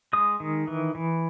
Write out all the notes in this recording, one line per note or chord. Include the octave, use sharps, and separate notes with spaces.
G#3 D#6
D#3
E3
E3